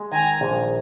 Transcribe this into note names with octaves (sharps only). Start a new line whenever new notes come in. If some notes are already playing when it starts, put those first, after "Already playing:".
Already playing: G#3
D#3 G#5 A#5
A#1